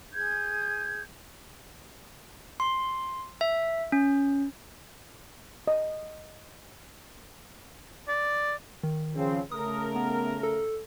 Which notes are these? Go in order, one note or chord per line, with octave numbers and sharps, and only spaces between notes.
G#4 G6 G#6
C6
E5
C#4
D#5
D5
D#3
C#3 F3 C4
C#3 A3 A#4 D#6
B3
A4